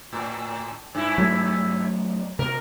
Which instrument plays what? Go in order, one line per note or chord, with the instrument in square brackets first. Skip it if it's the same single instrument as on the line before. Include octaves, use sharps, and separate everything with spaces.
[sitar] A2
G2 E4
[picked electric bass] F#3 A3 B3
[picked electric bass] C3 B3 [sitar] A#4